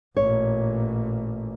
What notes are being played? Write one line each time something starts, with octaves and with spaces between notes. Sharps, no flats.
A1 A#2 C#5